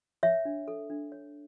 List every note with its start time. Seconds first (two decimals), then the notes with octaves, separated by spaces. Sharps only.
0.23 C#5 E5
0.45 D4
0.68 A4
0.90 D4
1.12 C#5